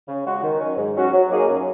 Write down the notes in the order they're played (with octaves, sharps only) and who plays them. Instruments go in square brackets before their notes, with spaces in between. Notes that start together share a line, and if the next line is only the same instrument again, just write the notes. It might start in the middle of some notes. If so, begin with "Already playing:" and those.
[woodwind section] C#3
G#3 F#4
D#3
F#3 C#4
G#2
F#3 C#4 F#4
F#3
A#3 D#4 G#4 C#5
F#2